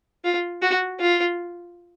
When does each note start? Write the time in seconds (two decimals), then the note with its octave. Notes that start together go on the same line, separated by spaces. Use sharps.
0.24 F4
0.62 F#4
1.00 F4